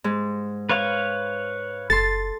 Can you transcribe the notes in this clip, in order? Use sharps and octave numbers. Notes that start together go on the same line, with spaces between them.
G#2
B4 C#5 F5
F#1 A4 C6 A6